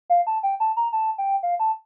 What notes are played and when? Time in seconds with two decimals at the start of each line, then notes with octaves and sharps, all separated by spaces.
0.10 F5
0.27 A5
0.43 G5
0.60 A5
0.77 A#5
0.93 A5
1.18 G5
1.43 F5
1.60 A5